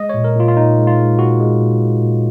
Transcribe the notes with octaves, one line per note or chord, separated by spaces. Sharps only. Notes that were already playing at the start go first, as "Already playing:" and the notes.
Already playing: G#3 D#5
A#2 C#5
A#4
A#2 F4
F4
A#2 D#4
G#3
F4
G#3
A#2 F#4
G#3
A#2
G#3
A#2